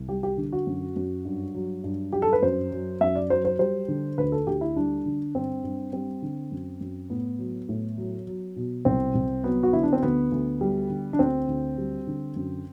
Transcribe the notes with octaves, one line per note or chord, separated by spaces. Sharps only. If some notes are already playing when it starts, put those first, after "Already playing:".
Already playing: C2
G3 G4
G4
D3
F#4
F#2
F#2
G2
F#3
G2
F#3 G4
A4
B4
F#2 C5
F#3
F#2 E5
D5
F#3 C5
C5
G3 C5
D3
D2 B4
A4
D2 G4
E4
G3 D4
D3
G2 C4
G2
G3 C4
D3
F#2
F#2
A2 B3
F#3
A2
F#3
F#3
B2
C2 C4
C2
F#3 B3
F#4
D3 E4
D4
C4
D2 B3
D2
G3
D3
D4
D2 C4
D2
G3
D3
F#2